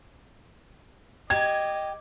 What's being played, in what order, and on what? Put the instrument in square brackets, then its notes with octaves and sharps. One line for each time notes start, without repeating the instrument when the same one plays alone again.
[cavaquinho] G4 [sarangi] D#5 [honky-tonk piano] G#6